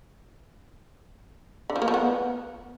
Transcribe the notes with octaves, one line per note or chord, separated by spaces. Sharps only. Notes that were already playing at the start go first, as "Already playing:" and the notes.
D3
F3
A#3
F3
B3